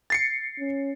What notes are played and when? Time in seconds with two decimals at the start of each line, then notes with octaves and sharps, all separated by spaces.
0.10 A6 C7 C#7
0.59 C#4